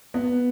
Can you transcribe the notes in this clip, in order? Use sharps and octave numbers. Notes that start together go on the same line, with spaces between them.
B3